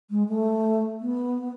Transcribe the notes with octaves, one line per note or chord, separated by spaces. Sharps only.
G#3
A3
B3